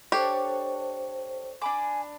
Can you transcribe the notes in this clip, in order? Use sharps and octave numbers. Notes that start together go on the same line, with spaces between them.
D4 G4 A4 C5 C#5
D4 G#5 B5 D6